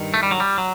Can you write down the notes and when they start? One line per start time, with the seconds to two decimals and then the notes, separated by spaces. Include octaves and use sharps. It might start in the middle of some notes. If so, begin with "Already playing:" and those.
Already playing: G2 D#3
0.14 A3
0.23 G3
0.31 F#3
0.40 G3
0.58 F#3